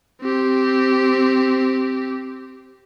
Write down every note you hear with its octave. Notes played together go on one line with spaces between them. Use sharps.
C4 G4